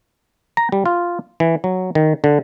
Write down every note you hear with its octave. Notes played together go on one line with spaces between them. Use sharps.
A#5
G3
F4
E3
F#3
D#3
D3